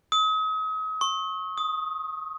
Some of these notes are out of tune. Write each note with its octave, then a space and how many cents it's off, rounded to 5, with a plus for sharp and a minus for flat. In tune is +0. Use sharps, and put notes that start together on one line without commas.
D#6 +40
C#6 -25
D#6 +10